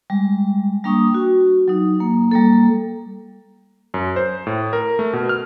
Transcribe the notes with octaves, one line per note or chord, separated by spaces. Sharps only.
G3 G#3
G3 A#3 D4 G5 C#6 D#6
F#4
F#3 D#4
A#3
G3 A#3 A4
F#2
C5
A2
A#4
A3
B2
F6